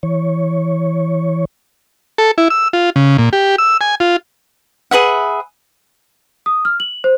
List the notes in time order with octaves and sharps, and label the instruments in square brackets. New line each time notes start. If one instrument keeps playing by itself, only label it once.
[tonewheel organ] E3 C#5
[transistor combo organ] A4
E4
E6
F4
C#3
A#2
G4
E6
G#5
F4
[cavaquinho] G#4 B4 E5 F#5
[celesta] D#6
F6
F#7
C5